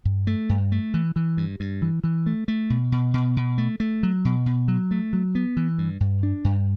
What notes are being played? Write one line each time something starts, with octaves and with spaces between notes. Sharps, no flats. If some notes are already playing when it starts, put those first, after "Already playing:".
G2
A3
G2
A3
E3
E3
G2
G2
E3
E3
A3
A3
B2
B2
B2
B2
A3
A3
F#3
B2
B2
F#3
A3
F#3
B3
E3
G2
G2
D4
G2